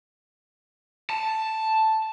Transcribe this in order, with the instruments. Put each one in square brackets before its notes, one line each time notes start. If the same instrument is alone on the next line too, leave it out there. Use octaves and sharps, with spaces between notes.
[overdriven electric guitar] A5